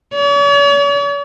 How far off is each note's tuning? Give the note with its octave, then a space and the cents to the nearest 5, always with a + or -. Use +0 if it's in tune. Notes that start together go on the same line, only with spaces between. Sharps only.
C#5 +45